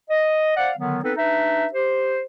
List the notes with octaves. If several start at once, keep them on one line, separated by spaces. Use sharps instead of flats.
D#5
C5 D5 F5 F#5
D3 D#3 F#3 B3
B3 C4 D#4 A4 B4
D4 D#4 B4 E5
G4 C5